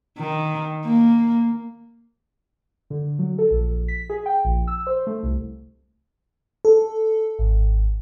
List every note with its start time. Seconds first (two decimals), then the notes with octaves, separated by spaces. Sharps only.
0.19 D#3
0.85 A#3
2.90 D3
3.19 F#3
3.38 A4
3.51 A#1
3.88 B6
4.10 G#4
4.26 G5
4.45 A#1
4.67 E6
4.87 C5
5.07 A3
5.23 C2
6.65 A4
7.39 G#1